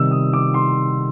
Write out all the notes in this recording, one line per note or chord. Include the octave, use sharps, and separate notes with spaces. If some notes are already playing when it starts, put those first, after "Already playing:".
Already playing: C3 D#3 G3 E6
D#6
D6
C6